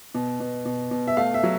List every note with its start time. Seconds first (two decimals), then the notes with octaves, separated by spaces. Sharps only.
0.15 B2
0.40 B2
0.66 B2
0.91 B2
1.07 E5
1.17 A3 F5
1.34 E5
1.43 F#3